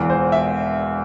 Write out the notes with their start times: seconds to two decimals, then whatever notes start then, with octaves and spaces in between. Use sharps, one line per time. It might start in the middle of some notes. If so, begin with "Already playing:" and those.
Already playing: E1 E2 E3
0.10 C5
0.32 E5